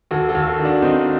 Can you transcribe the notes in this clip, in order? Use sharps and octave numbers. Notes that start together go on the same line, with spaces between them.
D#2 F#4 A4
F#4 A4
D#2
F#4 A4
D#3
D4 F#4
D#3 C4 D#4